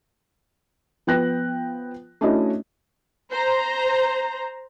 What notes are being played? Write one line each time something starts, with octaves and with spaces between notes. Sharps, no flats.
F3 B3 G5 F#6 A#6
A3 C#4 D4 E4 F#4 D#5
C5 A#5